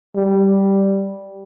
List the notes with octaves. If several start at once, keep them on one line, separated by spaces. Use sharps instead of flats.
G3